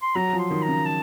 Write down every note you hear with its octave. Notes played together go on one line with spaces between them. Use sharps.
C6
F#3 A#5
F3
C6
D#3
A#5
C#3
A5